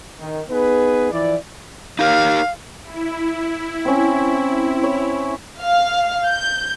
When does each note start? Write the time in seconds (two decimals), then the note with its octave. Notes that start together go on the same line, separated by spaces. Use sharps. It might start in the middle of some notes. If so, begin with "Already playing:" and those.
0.20 D#3
0.50 B3 D#4 G#4 B4
1.12 E3 F3 E4 D5
1.99 D#4 G4 A#4 F5
2.84 E4
3.85 C4 C#4
4.83 C#5
5.60 F5
6.27 G6